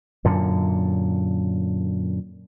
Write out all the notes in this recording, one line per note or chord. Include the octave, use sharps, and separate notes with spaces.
F#2 A#2 D3